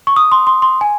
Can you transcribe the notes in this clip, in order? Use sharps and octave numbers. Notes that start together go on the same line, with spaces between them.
C#6
D#6
C6
C6
C6
G#5